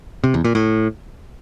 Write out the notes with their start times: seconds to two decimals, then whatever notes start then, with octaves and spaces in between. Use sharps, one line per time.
0.24 C3
0.34 E2
0.44 A#2
0.55 A2